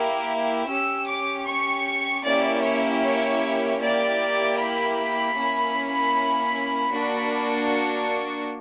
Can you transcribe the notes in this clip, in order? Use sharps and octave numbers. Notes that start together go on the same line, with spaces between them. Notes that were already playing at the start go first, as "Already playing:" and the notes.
Already playing: A#3 E4 G4
C#4 G4 E6
D6
C#6
A#3 C#4 E4 G4 D5
C#5
C#5
A#3 E4 G4 D5
B5
A#3 C#4 E4
A#3 D4 F#4
C#6